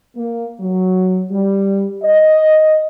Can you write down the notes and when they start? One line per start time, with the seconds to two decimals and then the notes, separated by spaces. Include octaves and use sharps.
0.16 A#3
0.60 F#3
1.31 G3
2.02 D#5